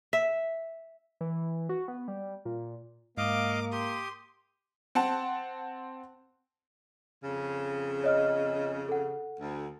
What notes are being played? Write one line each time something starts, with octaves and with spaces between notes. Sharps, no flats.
E5
E3
F#4
B3
G3
A#2
G#2 A#3 D#5 F5 D6
G4 C6 D#6
C4 F#5 A5
F2 C#3
C#5 D#5 F6
A4 F#5
D2